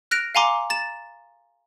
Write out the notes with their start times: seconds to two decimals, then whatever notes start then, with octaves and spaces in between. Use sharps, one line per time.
0.11 F6 F#6 A#6 D7 F7
0.35 F5 F#5 G#5 A#5 C6 D6
0.70 A#5 A6 E7